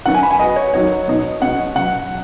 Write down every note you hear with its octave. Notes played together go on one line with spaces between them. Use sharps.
D#3 F#3 C#4 B4 F#5
G#5
B5
G#5
G#3 B3 F#4 B4 D#5
C#5
D#3 F#3 D#4 F#4 C#5
B2 B3 D#4
B2 G#3 C#4 F#4 F#5
C#3 F#3 B3 F#5